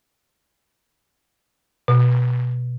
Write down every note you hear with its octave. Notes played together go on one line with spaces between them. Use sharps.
B2